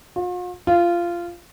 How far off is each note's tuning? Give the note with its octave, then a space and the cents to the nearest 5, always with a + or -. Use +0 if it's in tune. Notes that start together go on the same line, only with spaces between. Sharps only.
F4 +45
F4 -15